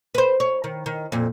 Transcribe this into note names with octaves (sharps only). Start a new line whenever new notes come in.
B4 C5
C#5
D#3
D#3
F2 A#2